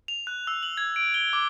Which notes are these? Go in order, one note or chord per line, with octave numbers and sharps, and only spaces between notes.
F7
F#6
E6
F#7
G#6
D7
G7
D6